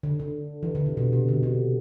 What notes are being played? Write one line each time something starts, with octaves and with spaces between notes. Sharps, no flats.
D3
D3
E3
D3
C3
B2
C3
D3
C3